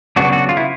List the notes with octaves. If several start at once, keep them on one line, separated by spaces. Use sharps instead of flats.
C#3 F#3 B3 D4 F#4
F#4
F4
E4